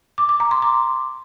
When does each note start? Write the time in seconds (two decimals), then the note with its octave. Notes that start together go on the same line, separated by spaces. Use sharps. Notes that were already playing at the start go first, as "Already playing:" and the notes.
0.18 D6
0.29 D6
0.40 A#5
0.51 C6
0.62 D6